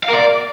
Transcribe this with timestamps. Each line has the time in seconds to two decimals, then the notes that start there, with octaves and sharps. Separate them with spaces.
0.03 F5
0.08 A#4
0.13 D5